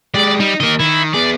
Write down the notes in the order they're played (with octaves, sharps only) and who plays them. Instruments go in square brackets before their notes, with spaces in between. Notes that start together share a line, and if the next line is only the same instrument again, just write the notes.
[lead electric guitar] G#3 G4 [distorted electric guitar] D5
[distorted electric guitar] G3 [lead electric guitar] D#4
[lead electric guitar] D#3 A#3 [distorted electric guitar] A#4 D#5
[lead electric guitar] D#3 [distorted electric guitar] E4
[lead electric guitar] B3 G#4 [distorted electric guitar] D5